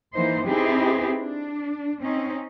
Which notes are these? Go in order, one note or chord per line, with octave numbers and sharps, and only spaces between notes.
E3 A#3 D#4 C5
C4 D#4 E4 G4 G#4 B4
D4
C4 C#4 D#4